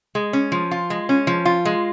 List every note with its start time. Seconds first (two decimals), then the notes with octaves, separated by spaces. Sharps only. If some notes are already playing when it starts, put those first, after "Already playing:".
0.15 G#3
0.33 C#4
0.52 F3
0.71 F4
0.90 G#3
1.09 C#4
1.27 F3
1.45 F4
1.65 G#3